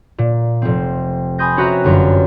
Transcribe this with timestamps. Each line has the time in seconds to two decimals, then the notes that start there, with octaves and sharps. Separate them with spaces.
0.18 A#2
0.62 F1 C4
1.39 G#5 B5 C6 D#6 G6 A#6
1.56 C4 C#4 F#4 B4 E5 A#5
1.84 G1 F#2 F4